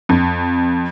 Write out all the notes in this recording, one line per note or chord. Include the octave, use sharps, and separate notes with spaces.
F2